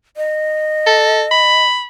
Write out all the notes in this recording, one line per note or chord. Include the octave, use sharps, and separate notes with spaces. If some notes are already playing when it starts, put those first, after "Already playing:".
D#5
A4
B5